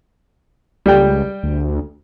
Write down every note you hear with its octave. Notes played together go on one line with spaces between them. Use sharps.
C#2 G3 G5
D2